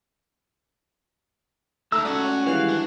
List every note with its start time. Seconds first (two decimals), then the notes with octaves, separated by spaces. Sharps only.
1.92 C#2 A3 D#4 E5 A#5 E6
2.05 G#3 C#4 F#4 D5
2.25 C#5
2.46 D#3 E3 G3 G#3 F5
2.69 D4